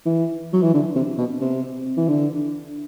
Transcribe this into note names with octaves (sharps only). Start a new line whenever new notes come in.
E3
F#3
E3
D3
C3
B2
C3
E3
D3